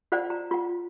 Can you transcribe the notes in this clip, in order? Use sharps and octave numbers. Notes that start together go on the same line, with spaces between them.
F4 C5 D5 F#5 G#5
A#5
F4 F#5